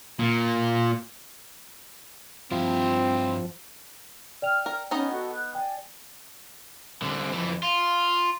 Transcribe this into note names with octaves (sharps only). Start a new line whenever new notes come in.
A#2
G2 F3 C4 E4
D5 G5 F6 F7
A#4
B3 C#4 D#4 D#5
F#4 A4 F#5
F#6
D5 G5 G#5
C2 D3
F2 E3
F4